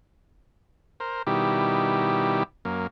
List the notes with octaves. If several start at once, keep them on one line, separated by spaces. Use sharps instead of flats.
A#4 C5
B2 D#3 G3 E4 G4
F#2 A#3